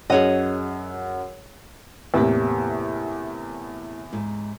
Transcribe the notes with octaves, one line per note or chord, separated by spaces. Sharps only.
F#2 G#4 C#5 D#5 F#5
E2 A2 C3 A#3 G4
G#2